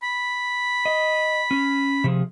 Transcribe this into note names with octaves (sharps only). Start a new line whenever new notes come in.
B5
D#5
C#4
C3 F3 G#4